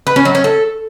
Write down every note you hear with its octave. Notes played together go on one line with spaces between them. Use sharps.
B4
C#4
F#3
C#4
A4